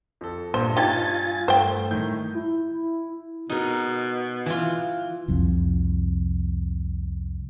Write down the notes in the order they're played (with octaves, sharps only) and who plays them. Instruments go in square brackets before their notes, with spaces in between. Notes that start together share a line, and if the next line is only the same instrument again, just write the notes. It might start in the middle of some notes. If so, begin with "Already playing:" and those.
[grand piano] F2 A4
[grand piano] G2 [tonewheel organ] A#2 [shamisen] C5
[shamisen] D#4 G4 [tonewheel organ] F4 G#5 A6
[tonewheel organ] G2 [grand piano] A3 [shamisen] C5 G5
[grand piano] A2 D#3 G6
[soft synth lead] E4
[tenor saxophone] B2 [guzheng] D#4 A#4
[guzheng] E3 F4
[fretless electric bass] C2 F2